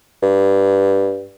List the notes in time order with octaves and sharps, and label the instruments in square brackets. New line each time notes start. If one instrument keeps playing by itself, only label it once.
[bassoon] G2